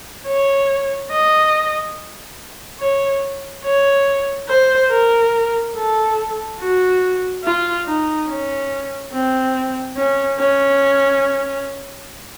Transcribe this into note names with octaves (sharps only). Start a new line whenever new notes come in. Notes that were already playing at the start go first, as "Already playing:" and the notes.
C#5
D#5
C#5
C#5
C5
A#4
A4
F#4
F4
D#4
C#4
C4
C#4
C#4